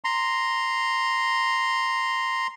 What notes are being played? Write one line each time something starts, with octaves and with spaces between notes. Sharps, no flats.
A#5 C6